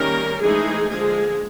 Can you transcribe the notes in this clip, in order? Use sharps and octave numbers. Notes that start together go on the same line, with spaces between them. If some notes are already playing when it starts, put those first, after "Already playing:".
Already playing: D#3 G3 A#3 C#4 A#4
E3 G#3 A3 C4 D#4 G#4
D3 F3 G#3 A#3 G#4